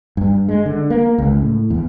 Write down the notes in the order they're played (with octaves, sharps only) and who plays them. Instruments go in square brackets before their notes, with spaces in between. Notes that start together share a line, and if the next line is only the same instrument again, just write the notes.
[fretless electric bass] G2
G#3
D3
A#3
C#2
A2
E2